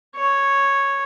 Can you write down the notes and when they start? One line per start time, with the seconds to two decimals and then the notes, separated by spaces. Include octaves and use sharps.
0.16 C#5